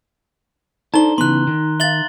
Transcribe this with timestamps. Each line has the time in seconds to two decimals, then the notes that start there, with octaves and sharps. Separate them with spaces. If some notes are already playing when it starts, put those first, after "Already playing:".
0.94 D4 D#4 A4 C5 A#5 G7
1.18 C#3 E3 B3 C6 F#6
1.47 D#3
1.80 E5 F5 A6 F#7 G7